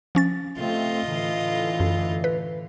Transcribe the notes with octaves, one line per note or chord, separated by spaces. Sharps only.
F3 C#4 A6
C3 A3 C4 F4 D#5
A2 D3 E3
F#2
B4